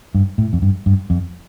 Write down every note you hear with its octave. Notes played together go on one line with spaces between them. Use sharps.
G2
A2
F2
G2
G2
F2